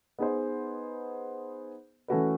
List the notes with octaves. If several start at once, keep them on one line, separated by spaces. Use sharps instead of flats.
B3 D#4 G#4 C5
E3 A3 C#4 F#4 B4